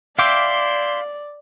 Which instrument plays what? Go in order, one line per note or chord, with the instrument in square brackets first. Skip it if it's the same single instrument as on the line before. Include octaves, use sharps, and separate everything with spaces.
[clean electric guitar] E4 E5 G5 [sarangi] D5 [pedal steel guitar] F5 D6 [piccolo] C6